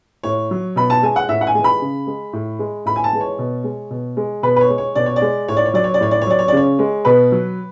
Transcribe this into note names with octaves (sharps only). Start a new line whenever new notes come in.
A2 C#5
F#3
B2 B5
A5
G#3 G#5
F#5
A2 E5
F#5
G#5
E3 G#3
B5
C#3
G#3
A2
G#3
A2 B5
G#5
A5
E3 G#3
C#5
B2
G#3
B2
G#3
B2 B4
B4
C#5
G#3
C#5
B2 D5
C#5
D5
G#3
A2 C#5
D5
C#5
F#3 D5
C#5
D5
A2 C#5
D5
C#5
F#3 D5
C#5
D5
C#3 C#5
G#3
B2 B4
F#3